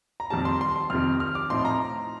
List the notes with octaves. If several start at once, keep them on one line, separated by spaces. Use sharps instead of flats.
A#5
F2 D#3 G3 A5
C6
C6
C6
F2 C3 D#3 F6
F6
D6
A2 F3 C4 D#4 C6
A#5